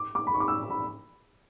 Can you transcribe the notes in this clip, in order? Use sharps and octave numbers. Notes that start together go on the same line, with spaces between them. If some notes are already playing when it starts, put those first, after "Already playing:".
Already playing: D6
D6
B5
C#6
D6
E6
B5